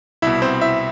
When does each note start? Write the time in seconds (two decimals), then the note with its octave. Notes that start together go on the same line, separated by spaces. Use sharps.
0.22 C2 B2 E4 E5
0.42 C4 C5
0.61 E4 E5